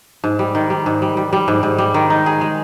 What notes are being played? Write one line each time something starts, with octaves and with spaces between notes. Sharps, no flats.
G#2
G3
D#3
G3
G#2
G3
G3
G3
G#2
G#2
G3
D#3
D#4
G#4
G#3